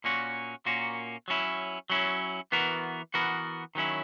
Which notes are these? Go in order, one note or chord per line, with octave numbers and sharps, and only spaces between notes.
A#2 A#3 C#4 F#4
A#2 A#3 C#4 F#4
F#3 C#4 E4
F#3 C#4 E4
E3 B3 F#4 A#4
E3 B3 F#4 A#4
D#3 F#3 C#4 E4